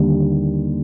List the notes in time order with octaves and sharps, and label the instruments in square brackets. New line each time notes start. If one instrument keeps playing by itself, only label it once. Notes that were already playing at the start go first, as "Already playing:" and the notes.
Already playing: [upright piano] D#2 D3 G3